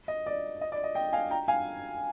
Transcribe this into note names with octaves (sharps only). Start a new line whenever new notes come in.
D#5
D5
D#5
D5
D#5
D#5 G5
F5 G#5
G5 A#5
F5 G#5